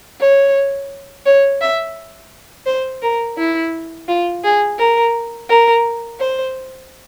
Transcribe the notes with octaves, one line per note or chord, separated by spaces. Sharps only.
C#5
C#5
E5
C5
A#4
E4
F4
G#4
A#4
A#4
C5